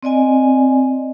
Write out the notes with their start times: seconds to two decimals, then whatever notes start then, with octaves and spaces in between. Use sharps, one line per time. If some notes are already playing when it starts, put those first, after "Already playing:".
0.03 C4 D5 D#5 G#5